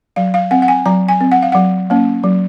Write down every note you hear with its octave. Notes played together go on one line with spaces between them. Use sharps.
F#3 F5
F5
C4 F#5
F#5
G#5
F#3 A#5
G#5
C4
F#5
F5
F#3 F#5
A#3 C#4
F#3